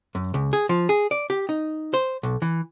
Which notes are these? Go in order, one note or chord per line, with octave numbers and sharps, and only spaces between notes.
F#2
C#2
G#4
F3
G#4
D5
G4
D#4
C5
B1
E3